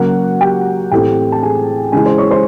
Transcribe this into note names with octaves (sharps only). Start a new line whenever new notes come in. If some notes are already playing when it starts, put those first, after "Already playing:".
Already playing: C#3 F#3 A#3 F#4 F#5
G4 G5
A2 E3 A3 C4 G4 G5
A5
G#4 G#5
C#3 E3 G#3 G#4 G#5
C5 C6
C#5 C#6
C5 C6